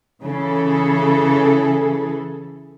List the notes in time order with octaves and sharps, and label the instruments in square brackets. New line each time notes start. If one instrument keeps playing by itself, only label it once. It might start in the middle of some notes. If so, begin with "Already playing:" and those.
[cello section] C#3 E3 G#4 A4